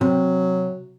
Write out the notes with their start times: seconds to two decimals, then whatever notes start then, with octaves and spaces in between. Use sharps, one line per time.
0.01 C3 F#3